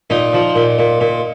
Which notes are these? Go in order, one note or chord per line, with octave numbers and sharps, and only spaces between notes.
A#2 D#4
F3
A#2
A#2
A#2